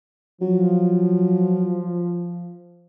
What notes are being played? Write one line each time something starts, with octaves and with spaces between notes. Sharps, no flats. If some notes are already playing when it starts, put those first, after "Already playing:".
F3 F#3